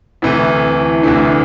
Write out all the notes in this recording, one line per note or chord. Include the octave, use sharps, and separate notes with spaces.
D2 C3 E3 A3 E4
D2 C3 E3 A3 D4